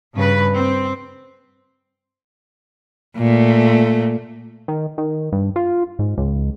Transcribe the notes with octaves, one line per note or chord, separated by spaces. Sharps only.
G2 C#3 B4
C4
A#2 A3
D#3
D#3
G2
F4
G#2
C#2